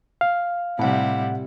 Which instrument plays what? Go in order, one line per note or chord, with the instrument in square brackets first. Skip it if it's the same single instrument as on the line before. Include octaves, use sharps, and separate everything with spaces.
[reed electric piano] F5
[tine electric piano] A2 F#5 [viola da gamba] C3 G3 E4